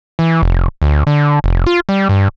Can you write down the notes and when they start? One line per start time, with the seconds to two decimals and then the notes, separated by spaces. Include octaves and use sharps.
0.19 E3
0.42 F1
0.82 D2
1.07 D3
1.44 F1
1.67 F4
1.89 G3
2.09 G2